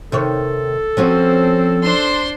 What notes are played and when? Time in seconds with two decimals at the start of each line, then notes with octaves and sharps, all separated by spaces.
0.12 C3 D#3 A4 C#5
0.97 F3 C4 C#4 F#4
1.82 D4 C5 C6